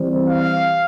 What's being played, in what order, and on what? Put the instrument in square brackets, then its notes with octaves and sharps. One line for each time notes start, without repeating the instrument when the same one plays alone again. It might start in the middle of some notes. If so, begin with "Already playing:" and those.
Already playing: [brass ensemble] E3 G3 C4
F5